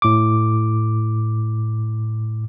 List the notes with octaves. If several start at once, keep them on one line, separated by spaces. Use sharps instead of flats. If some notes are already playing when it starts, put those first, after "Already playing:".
A2 D6